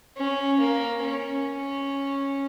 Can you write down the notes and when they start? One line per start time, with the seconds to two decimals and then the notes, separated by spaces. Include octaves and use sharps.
0.17 C#4
0.60 A#3
1.03 C#4